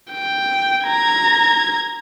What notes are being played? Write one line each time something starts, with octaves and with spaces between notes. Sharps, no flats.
G5
A#5 G#6